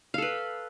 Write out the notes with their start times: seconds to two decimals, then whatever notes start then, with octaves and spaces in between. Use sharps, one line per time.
0.14 F5
0.18 A4
0.22 B4